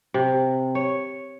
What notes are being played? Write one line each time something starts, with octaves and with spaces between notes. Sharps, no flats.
C3
C#5